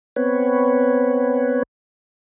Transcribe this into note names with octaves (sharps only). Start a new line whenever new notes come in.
B3 C4 B4 C#5